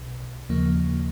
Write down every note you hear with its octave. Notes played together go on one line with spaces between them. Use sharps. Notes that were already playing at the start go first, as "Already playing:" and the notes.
Already playing: B1 B2
D#2 C#3 F3 A#3